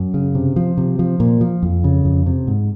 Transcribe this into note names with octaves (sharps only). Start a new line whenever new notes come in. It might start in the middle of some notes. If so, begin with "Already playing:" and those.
Already playing: F#2
C#3
C3
F3
C3
F3
A#2
F3
F2
C#3
F2
C3
G#2